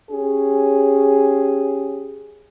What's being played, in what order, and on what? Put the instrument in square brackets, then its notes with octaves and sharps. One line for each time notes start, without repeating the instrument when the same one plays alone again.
[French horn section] C#4 G4 G#4